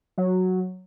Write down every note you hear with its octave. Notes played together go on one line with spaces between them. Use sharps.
F#3